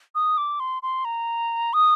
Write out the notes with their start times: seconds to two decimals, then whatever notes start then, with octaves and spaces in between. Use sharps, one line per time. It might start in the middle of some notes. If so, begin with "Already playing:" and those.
0.15 D#6
0.38 D6
0.60 C6
0.83 C6
1.05 A#5
1.73 D#6